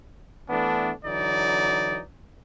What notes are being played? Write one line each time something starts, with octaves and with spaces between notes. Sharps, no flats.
E3 A3 B3 D4
D3 E3 F#3 D#4 D5